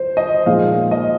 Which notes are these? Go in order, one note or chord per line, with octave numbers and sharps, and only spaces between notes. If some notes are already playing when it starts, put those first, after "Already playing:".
Already playing: C5
D#5
A#2 F3 G#3 D#4 F5
D#5